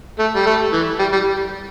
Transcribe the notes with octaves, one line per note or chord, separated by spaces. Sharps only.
A3
G3
A3
E3
G3
G3